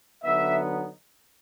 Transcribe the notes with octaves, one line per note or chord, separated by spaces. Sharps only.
D3 F#3 B3 D#4 E5